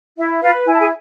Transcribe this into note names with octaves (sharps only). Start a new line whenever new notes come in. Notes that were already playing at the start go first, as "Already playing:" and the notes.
E4 E5
F4 B4 F5
E4 G#5
A5
G#4 G#5